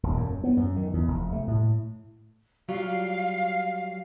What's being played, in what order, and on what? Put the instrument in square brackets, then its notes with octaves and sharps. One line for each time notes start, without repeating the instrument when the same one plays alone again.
[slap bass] D#1
F#2
B3
F#2
D#3
E2
F1
A3
A2
[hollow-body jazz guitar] F#3 G3 F4 [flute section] F5